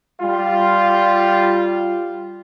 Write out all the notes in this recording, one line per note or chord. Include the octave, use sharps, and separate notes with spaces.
G3 F4